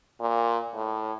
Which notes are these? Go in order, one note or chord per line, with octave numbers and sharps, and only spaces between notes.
A#2
A2